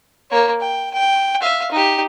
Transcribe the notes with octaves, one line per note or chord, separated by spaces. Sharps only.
A#3 C#5
G5
G5
E5 F5
D#4 G4